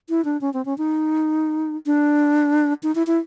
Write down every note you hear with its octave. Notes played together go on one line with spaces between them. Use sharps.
E4
D4
C#4
C4
C#4
D#4
D4
D#4
E4
E4